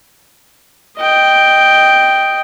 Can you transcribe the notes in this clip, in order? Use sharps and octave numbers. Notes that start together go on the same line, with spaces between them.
D#5 G5